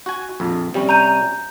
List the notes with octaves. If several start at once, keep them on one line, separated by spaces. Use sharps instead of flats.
F#4 G#5
A#1 F2
C3 G3 C#4
A#5 G6 D#7